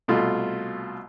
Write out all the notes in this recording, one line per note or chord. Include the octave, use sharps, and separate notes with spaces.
C2 B2 A3 F4